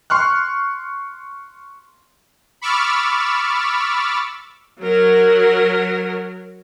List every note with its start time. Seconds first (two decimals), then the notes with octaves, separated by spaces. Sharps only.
0.10 C6 C#6 F6 F#6
2.61 B5 C#6 D6 E6 F6 A6
4.81 F#3 A#4